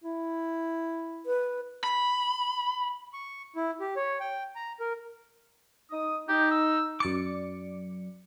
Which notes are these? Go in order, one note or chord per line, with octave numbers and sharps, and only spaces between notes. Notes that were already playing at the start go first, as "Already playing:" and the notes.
E4
B4
B5
C#6
E4
G4
C#5
G5
A#5
A#4
D#4 D#6
D#4 G4
E6
F#2 D5 D6 C#7